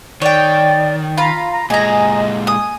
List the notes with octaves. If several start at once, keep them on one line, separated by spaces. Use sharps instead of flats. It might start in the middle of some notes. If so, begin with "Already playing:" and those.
D#3 C#5 D5 G5
F4 A#5 B5
A#5
A#2 G#3 D#5 G#5 A#5
G#5 D#6